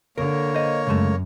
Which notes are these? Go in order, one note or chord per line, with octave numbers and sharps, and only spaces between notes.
D3 A#3 A#4 C#5
C5 D#5
F#2 C#3 G#3 A3